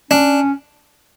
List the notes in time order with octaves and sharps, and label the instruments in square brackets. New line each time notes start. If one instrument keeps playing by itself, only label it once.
[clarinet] C#4 [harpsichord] D4